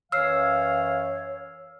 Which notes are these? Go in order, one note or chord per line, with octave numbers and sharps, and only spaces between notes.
F#2 E3 C#5 F5 E6 F6 C7